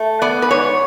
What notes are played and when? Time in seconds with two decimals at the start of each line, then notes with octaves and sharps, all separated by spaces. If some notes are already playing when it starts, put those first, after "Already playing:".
Already playing: A3
0.22 B3 D5
0.42 B4
0.51 G#2 C#5